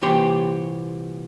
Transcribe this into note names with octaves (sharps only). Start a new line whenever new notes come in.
C2 A#2 E3 G4 C#5 C6